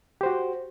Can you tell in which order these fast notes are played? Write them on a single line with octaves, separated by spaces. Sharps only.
G4 C5 F#4